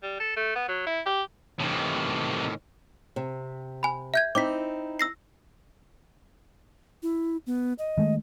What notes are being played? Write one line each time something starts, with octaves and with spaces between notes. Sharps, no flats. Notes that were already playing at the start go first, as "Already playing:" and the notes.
G3
A4
A3
B3
F#3
E4
G4
A2 C3 D#3 E3
C3
G#5 B5
E5 G6 G#6
C4 D#4 E4 D6 B6
E6 A#6 C7
E4
B3
D#5
D#3 G#3 A3